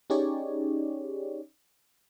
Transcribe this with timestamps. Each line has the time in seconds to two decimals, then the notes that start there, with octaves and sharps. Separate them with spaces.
0.10 C#4 D#4 G4 G#4 C#5 D5